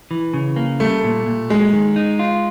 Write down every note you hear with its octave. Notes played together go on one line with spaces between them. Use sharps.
E3
C#3
A#3
G3 A3
A#2
A#2
F#3 G#3
D#3
D#4
F4